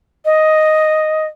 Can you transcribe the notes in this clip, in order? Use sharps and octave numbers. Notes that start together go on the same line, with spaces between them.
D#5